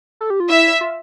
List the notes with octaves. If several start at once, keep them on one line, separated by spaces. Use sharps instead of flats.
A4
G4
F4
E4 E5
F4